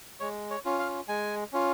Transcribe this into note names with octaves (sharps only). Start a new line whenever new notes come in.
G#3 C#5
C#5
C#4 F4
F5
G#3 G#5
C#4 F4